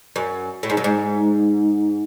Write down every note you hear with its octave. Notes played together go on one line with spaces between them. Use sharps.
F#2
A2
G#2
F#2
G#2